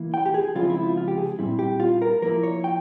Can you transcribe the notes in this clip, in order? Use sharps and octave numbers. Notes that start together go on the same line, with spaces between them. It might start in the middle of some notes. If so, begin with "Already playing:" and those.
Already playing: E3 A#3 E4
G5
G4
G#4
C#3 F3 G#3 C4 E4 F4
E4
F4
F4
G4
G#4
A#2 G3 C4 E4
G4
F4
A#4
F3 A#3 E4 A#4
C#5
G5